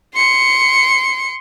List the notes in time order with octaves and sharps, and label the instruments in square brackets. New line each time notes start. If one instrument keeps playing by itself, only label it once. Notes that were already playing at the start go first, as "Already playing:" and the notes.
[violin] C6 C#7